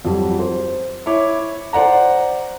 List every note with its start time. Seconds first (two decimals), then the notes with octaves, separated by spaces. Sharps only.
0.05 F2 F#3 G3
0.39 C5
1.06 E4 C#5 D6
1.73 C5 D5 F#5 A#5